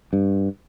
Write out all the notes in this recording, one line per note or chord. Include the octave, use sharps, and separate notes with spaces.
G2